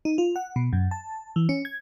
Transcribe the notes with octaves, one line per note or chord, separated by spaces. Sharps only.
D#4
F4
F#5
B2
F#2
A5
E3
C#4
G#6